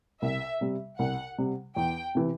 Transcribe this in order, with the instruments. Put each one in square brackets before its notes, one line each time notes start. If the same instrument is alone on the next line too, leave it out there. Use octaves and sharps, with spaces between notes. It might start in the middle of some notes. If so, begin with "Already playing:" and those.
[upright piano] C2 [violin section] E5
[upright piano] C3 G3
[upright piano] C2 [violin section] F#5
[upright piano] C3 G3
[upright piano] E2 [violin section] G5
[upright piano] C3 E3